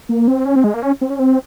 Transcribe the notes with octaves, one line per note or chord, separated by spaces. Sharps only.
A#3
C4
C#4
C4
G#3
A#3
C#4
C4
C#4
C4